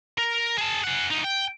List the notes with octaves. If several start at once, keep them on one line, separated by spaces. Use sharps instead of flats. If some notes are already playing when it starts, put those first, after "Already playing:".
A#4
G#4 A5
G#4 F#5
D2 D#4
G5